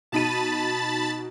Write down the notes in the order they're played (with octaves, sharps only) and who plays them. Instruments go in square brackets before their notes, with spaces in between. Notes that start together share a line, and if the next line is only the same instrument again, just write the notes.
[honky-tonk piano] B2 D#4 D#7 [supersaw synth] A5 B5 A6